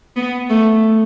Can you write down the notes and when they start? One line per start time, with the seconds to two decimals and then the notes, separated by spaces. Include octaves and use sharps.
0.16 B3
0.50 A3